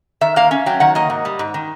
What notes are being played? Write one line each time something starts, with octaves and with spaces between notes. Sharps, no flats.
D#3 E5
A#3 F5
C#4
F#3 G5
D#3 F#5
A#3 D#5
G#2
G3
G#2
D#3